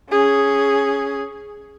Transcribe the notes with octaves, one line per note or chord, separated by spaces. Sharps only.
C#4 G#4